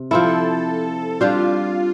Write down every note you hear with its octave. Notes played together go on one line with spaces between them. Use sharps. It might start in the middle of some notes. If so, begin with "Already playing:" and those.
Already playing: C3
F3 C4 E4 A4
G3 D4 F4 G4